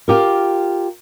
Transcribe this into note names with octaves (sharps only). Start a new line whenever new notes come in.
F4 G4 A#4